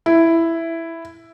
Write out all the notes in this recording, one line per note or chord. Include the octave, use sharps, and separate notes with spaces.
E4